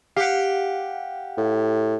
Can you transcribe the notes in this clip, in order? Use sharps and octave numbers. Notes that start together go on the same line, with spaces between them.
G4 F5 F#5
A2